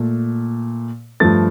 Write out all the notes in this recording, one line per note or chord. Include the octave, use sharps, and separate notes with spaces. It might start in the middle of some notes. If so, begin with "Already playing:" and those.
Already playing: A#2 A3
G2 F3 A3 A6